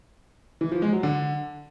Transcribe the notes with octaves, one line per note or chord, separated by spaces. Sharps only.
E3
F3
G#3
F#3
D3